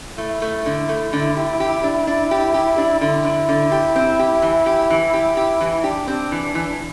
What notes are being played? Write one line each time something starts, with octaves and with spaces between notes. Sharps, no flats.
A3 E4
A3
D3
A3
D3
G4
G4
D4
D4
G4
G4
D4
D3 E4
D3
D3
G4
C4
G4
E3
G4
E3
G4
G4
E3
D4 G4
C4
E3
E3